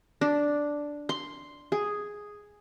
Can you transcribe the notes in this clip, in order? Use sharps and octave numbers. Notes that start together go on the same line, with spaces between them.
D4
C6
G#4